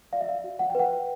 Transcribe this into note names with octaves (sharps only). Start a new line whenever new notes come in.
D5 F5
E5
F5
F#4
F#5
G5
B4 F#5